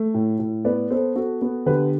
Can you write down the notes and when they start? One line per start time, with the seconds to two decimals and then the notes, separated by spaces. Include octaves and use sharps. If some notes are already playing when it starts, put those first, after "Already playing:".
Already playing: A3
0.14 A2
0.39 A2
0.65 B3 B4 D5
0.90 B3 A4 C5
1.15 B3 F#4 A4
1.42 B3
1.66 D3 G4 B4